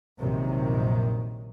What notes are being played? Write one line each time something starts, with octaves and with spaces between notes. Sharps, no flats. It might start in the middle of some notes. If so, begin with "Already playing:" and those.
A#1 F#2 C3 D#3